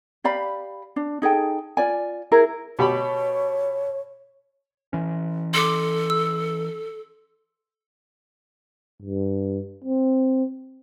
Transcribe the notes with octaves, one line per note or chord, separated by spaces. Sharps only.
G4 D5 F5 B5
D4
D#4 G#4 A4 G5
F4 D5 G#5
E4 G#4 A#4
B2 G4 C#5 B5
E3 C#4
A4 C6 D6
E6
G2
C4